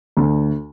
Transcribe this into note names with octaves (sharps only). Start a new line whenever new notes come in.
D2